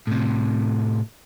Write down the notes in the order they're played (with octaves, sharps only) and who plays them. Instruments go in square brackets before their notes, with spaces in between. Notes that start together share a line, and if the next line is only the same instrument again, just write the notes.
[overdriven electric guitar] A2 C3